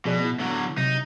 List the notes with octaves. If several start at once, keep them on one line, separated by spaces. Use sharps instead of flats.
B2 F3 G#4 D5
B3 E4
D3 F#3
C3 F#3 D#4